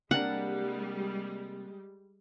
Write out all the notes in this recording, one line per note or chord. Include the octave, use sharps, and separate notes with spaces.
C3 G3 G#3 A#3 D4 F#5